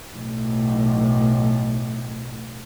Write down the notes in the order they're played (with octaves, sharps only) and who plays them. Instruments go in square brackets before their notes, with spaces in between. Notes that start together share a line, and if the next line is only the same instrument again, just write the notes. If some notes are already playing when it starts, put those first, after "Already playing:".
[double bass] B1 A2